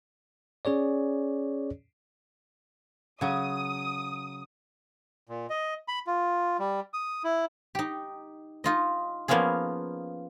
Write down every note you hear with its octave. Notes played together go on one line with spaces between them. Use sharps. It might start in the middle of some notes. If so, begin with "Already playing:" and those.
C#4 G#4 C#5 D5
C#3 F#3 D#6
A#2
D#5
B5
F4
G3
D#6
E4
D#4 G4
D#4 F4 D#5
F3 A#3 B3 C#4 F4 G#4